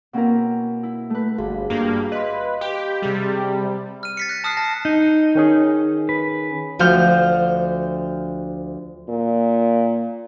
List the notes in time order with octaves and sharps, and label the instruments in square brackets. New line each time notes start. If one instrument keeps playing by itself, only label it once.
[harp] B2 A#3 C4 C#4 E4 A#4
E4
A3 B4
[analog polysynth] G1 [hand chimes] F#4 G#4 F5
[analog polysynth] G2 A#3
[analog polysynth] B4 [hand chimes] D#5 F5 C6
[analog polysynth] G4
[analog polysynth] C3 G3 [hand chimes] G#4
[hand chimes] C4
[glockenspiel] F6 D#7
A6 B6 C#7
F#6 A#6
A5 D#6 F6 F#6 C7
A5 A#6
[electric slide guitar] D#4
[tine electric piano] D#3 C#4 G#4
[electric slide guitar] B4
[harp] D2 F3 F#4 F5 F6 G6
[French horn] A#2